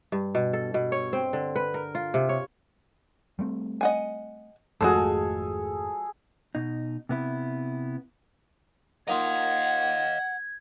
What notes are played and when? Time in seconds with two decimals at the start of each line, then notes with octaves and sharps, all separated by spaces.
0.12 G2
0.35 B2
0.53 A4
0.74 B2
0.92 C#5
1.13 C4
1.33 D3
1.56 B4
1.74 A#4
1.95 F4
2.14 C3
2.29 C#5
3.39 G3 A3 C4
3.81 D#5 F#5 G#5
4.81 G#1 F2 F3 G#3 A3 F#4 G#4 A4
6.55 B2 D#4
7.09 C3 B3 E4
9.08 A#3 D#4 F4 D#5 F5 F#5 G#6